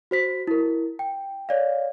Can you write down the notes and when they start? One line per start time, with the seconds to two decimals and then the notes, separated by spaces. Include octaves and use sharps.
0.11 F#4 C5 B6
0.47 E4 A#4
0.99 G5
1.49 C#5 D5 F5